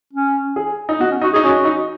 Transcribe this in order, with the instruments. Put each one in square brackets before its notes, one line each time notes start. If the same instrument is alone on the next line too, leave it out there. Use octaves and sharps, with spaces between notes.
[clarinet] C#4
[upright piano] G#4
D#4
[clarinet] B3 [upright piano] F#4
[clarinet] C#4
[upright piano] D#4 [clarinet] F#4
[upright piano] D#4 [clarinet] G#4
[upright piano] C#4 [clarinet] F#4
[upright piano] D#4